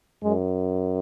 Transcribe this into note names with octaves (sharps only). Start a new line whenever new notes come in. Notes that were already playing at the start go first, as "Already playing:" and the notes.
F#2 G#3